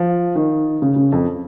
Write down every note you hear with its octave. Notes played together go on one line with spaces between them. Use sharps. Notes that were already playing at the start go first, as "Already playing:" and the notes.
Already playing: F3
D#3
C#3
C#3
F2